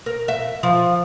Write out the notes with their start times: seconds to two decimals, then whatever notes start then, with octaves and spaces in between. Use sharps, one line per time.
0.06 A#4
0.28 E5
0.63 F3